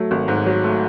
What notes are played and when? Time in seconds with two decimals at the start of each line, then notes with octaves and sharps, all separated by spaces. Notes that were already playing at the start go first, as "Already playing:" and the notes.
Already playing: F#3 A3
0.11 G#1
0.28 G#2
0.46 F#3
0.64 A3